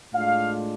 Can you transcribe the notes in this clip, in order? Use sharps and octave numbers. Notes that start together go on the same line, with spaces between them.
A2 G#3 D4 F4 F5